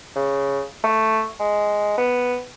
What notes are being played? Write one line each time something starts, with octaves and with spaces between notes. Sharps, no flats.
C#3
A3
G#3
B3